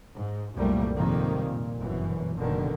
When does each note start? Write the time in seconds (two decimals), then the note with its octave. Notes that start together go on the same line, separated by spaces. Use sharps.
0.17 G#2
0.56 C2 F#2 A#2 G3 A3 A#3
0.96 F2 G#2 C3 D#3 G3 A#3
1.45 A#2
1.80 G1 F#2 B2 E3
2.35 F#1 B2 D3 D#3